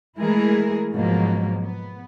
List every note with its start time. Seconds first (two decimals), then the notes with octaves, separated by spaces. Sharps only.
0.17 E3 G#3 A3 E4 G#4 A#4
0.93 G#2 B2 F3 F#3 A#3
1.61 B3